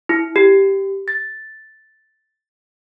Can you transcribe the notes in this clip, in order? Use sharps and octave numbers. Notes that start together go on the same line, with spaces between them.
E4
G4
A6